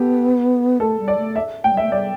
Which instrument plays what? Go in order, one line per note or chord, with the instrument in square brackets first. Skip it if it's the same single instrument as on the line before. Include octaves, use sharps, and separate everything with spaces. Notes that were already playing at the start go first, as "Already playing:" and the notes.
Already playing: [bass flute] B3 [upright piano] G4 A4
[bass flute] A3 [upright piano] A4
[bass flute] G3
[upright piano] D5
[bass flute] A3
[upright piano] E5
[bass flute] A3 [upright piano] G5
[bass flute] G3
[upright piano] E5
[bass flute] A3
[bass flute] G3 [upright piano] D5